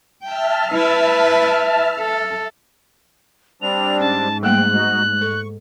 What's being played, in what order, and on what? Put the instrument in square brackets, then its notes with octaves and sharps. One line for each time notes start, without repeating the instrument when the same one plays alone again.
[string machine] E5 A5 F6 [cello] G5
[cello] E4 B4
A4
[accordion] G3 C4 D4 [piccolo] F7
[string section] G#2 [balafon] C#4 [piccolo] A5
[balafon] G3 A3 A#3 [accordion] C4 G5 [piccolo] F#6
[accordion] D#4 F#4
[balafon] A4 [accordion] C#6